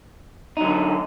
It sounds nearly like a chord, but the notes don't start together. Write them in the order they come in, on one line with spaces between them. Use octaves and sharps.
D#4 F#3 D3